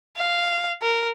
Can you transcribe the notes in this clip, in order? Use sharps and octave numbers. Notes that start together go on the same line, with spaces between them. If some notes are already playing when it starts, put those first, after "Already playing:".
F5
A#4